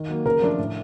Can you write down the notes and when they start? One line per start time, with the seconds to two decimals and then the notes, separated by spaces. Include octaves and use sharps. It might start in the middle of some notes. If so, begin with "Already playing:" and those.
Already playing: D#3
0.09 F#3 A#3
0.25 C#3 A#4
0.42 F3 A3 D4 F4
0.58 A2